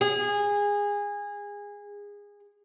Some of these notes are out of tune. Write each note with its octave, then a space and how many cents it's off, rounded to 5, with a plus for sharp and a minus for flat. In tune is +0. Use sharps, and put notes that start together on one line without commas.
G#4 -20